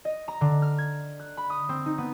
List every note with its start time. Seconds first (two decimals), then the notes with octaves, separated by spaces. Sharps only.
0.05 D#5
0.28 A#5
0.41 D3
0.62 F6
0.78 G#6
1.19 F#6
1.37 B5
1.50 D#6
1.69 C4
1.86 D#4
1.98 B3